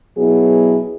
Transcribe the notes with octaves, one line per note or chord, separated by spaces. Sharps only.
B2 F#3 B3 E4 G#4